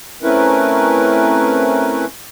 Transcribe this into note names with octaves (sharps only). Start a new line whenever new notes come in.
A3 C4 C#4 E4 A#4 B4